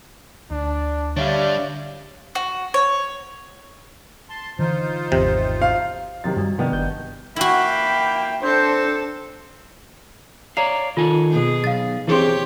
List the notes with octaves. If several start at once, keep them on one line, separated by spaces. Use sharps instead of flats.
D2 D4
D3 G3 D4 C#5 D5 E5 F5
F#4
C#5
A5 C6
D3 E3 D#4 F4 C5
G#1 E2 C3
F5
F#2 C3 D#3 A6
G2 F#3 G3
C3 D#3 B3 D4
G1 G6
A#3 E4 F#4 E5 G5 B5
C4 D4 A4 C5
C#5 D5 F5 A#5 C7
D#3 F4 A4 G#5
B2 G#4
B1 F5 A6
E3 C4 E4 G4 G#4 C#5 C6